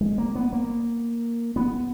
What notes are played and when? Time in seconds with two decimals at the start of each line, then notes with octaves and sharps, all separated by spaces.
0.01 G#3
0.18 A#3
0.35 B3
0.53 A#3
1.56 B3